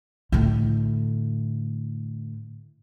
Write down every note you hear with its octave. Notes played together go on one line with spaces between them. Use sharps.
A2 D3